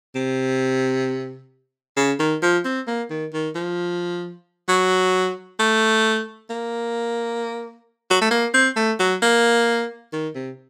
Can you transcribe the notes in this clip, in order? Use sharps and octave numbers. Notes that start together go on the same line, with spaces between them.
C3
C#3
D#3
F3
C4
A#3
D#3
D#3
F3
F#3
A3
A#3
F#3
A3
A#3
C4
A3
F#3
A#3
D#3
C3